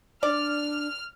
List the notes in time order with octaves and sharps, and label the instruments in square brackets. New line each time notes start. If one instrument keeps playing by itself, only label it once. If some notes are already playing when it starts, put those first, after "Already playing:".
[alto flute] D4 [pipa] D5 [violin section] F6